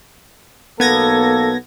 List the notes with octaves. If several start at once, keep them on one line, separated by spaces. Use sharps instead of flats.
B1 A#3 B3 A4 G#6 A#6